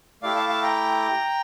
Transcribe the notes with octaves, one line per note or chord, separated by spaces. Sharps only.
A3 E4 G4 D5 F5
F5 A5
F5 A5
G5 A#5